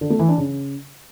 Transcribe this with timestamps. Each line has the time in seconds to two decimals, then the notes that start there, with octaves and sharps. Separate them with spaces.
0.01 D3
0.10 A3
0.19 E3
0.28 D4
0.38 C#3